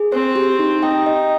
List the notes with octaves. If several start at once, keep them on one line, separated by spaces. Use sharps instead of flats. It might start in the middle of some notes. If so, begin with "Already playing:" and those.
Already playing: G#4
C4 C5
G4
D#4
D#4 G5
D#5